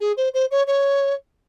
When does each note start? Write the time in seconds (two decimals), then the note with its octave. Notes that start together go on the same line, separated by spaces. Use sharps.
0.01 G#4
0.17 C5
0.34 C5
0.51 C#5
0.67 C#5